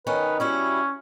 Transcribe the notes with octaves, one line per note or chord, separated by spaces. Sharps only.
D#3 C#4 D#4 B4
G3 C#4 E4 F#4